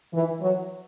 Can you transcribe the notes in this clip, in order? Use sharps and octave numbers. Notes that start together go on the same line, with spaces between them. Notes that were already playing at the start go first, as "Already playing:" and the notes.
E3
F#3